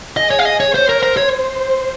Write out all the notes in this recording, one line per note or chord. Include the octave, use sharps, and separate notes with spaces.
G#4 D#5
C#5
F5
D#5
C#5
C5 C#5
A#4
A#4 C5
C#5